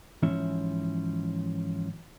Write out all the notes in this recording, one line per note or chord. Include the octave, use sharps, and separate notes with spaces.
G#2 E3 F3 C#4 E5